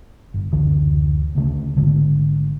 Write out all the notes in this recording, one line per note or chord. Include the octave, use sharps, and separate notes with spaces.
G1
F#1 D2 D3 E3
D2 C#3 A3
G#1 D3 G#3